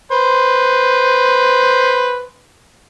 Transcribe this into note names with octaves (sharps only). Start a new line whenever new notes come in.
B4 C5